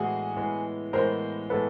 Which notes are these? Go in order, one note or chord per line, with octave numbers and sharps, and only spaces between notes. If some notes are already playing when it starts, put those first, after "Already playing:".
Already playing: A2 E3 G#3 B3 F#4 G#4
A2 E3 G#3 B3
A2 E3 G#3 B3 A#4 C5
A2 E3 G#3 B3 A4 B4